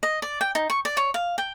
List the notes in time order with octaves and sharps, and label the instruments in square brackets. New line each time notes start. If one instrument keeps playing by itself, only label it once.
[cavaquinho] D#5
D5
G5
D#4
C#6
D5
C#5
F5
G5